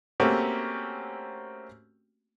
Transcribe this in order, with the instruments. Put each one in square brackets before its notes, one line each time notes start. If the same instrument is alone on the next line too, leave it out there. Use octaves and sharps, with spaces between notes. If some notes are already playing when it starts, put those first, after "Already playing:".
[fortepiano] A3 A#3 C4 C#4 F#4 G4